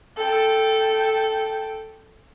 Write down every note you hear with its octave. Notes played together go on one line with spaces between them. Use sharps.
A4 G5